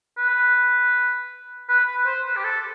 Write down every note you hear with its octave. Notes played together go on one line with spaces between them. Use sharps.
B4
B4
B4
C5
B4
G4
A4